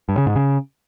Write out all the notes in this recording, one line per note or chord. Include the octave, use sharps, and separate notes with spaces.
G2
C#3
G#2
C#3